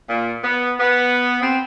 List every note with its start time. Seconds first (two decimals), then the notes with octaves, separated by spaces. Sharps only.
0.08 A#2
0.42 B3
0.79 B3
1.42 C4